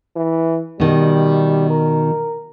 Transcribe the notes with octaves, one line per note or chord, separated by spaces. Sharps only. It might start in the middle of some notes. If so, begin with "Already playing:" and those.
E3
B2 D#3 G3
A#4